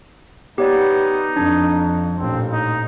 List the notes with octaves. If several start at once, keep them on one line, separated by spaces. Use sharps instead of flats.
B3 D#4 G4 C#5 D5
F2 D4
A1 A#2 C4
D#4